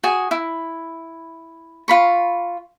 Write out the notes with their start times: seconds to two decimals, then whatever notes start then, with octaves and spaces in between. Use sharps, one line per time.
0.04 F#4 G#4 G#5
0.31 E4
1.88 F4 B5 C#6